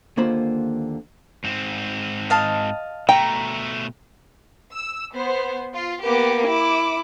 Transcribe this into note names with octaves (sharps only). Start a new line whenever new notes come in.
D#2 D3 A#3 F4 C5 B5
G#2 C4
D#5 F5 A5
B2 A3 G5 A#5
E6
B3 C5
F4
A#3 B3 G4 D6
E4 D6